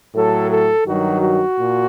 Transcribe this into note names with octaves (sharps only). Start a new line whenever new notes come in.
A2 F#3 A4
A4
G2 D#3 F#3 F#4
F#4
A#2